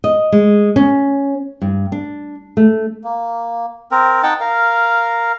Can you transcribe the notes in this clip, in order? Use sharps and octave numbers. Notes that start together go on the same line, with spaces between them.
D#5
G#3
C#4
G2
D4
A3
A#3
C4 A#4
D#4 F#5 G5 A5
A#4 F5